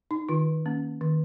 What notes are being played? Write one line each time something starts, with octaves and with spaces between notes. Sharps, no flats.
D#4
D#3 F4
A#3 C#4
D#3